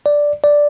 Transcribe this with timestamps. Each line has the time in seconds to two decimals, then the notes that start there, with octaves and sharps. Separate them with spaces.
0.06 D5
0.44 D5